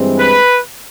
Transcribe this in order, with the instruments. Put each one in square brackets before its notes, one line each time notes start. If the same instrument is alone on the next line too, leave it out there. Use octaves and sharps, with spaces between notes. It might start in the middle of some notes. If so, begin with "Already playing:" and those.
Already playing: [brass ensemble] G2 E3 G#3 C4
[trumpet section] B4